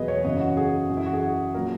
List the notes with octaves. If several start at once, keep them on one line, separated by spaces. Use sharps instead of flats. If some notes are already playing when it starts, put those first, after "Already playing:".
Already playing: E2 B2 F#3 G#4 B4 D#5
C#5
F#2 C#3 E3 D#5
F#4
G#4
F#2 E3
E4
F#4
G#4
A#2 F#3 A#4